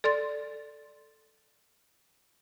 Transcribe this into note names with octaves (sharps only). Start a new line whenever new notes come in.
A4 D5 C6 A6